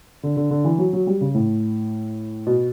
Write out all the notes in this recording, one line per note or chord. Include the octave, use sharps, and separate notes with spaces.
D3
D3
D3
E3
F#3
F#3
G3
C#3
A2
B2